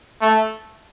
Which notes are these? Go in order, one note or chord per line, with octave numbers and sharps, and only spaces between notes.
A3